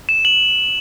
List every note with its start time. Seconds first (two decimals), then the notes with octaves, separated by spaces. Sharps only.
0.09 E7
0.25 F#7